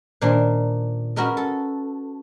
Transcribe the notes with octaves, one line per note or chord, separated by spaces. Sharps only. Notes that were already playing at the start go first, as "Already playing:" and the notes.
A#2 D#3 F3 D4 A#4
C#4 F#4 G#4 A#4 B4 D#5
A4